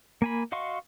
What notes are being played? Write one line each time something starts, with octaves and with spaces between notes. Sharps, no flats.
A#3 G#5 B5
F#4 D#5 F5 C6 C#6